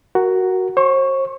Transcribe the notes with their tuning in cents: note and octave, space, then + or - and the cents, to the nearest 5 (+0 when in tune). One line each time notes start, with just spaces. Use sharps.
F#4 +10 A#4 +0
C5 +40 C#6 +0